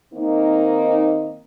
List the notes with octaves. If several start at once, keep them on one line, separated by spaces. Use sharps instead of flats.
D#3 A#3 C4 D#4